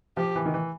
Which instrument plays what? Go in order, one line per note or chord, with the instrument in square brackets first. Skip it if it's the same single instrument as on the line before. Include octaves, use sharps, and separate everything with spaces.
[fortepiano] F3 [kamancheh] G4
[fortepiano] E3
D#3
E3